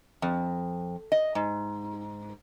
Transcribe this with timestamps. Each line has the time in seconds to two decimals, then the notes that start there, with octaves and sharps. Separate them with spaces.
0.22 F2
1.12 D#5
1.35 G#2